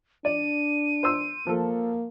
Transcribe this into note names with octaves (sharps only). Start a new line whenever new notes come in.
D4 D5 D#7
C5 C6 E6
F3 A#3 A4